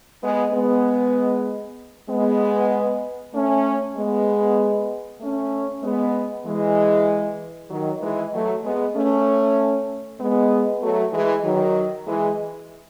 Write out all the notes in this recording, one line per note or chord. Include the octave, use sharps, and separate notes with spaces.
G#3 B3
G#3 B3
G#3 B3
A3 C#4
G#3 B3
A3 C#4
G#3 B3
E3 G#3
D#3 F#3
E3 G#3
F#3 A3
G#3 B3
A3 C#4
G#3 B3
F#3 A3
E3 G#3
D#3 F#3
E3 G#3